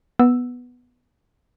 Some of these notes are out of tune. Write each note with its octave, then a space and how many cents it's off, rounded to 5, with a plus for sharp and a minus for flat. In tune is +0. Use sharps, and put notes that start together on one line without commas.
B3 +0 E6 +0